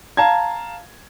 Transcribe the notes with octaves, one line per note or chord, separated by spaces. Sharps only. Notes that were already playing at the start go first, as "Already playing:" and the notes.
F5 A5 A#5 G#6